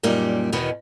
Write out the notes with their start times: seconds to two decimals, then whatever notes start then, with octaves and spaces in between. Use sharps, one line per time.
0.03 F#2 A#2 G3 A#3 D#4
0.52 E2 B2 D#3 B3